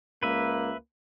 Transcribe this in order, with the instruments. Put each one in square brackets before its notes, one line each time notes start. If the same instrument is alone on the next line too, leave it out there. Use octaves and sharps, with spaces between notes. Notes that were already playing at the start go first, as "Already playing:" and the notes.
[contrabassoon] C#2 [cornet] A#3 [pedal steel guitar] B4 E5